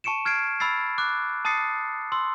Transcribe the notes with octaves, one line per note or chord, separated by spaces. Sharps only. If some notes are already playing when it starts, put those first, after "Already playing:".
A5 C#6 C#7 D7 E7
F6 G#6 C7 D7
B5 E6 A6 C7
D6 F#6
A5 D#6 A6 C7 C#7
C6 E6